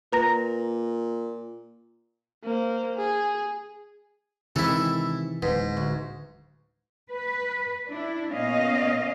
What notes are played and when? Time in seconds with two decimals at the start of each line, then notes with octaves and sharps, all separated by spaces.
0.12 A#2 B4 A#5 A#6
2.43 A#3 C5
2.97 G#4
4.56 C3 D#3 E3 G#3 E4 A4
5.43 D1 G#2 B4
5.77 D2
7.11 B4
7.87 D4 E4
8.34 A#2 B3 C#4 D#5 F5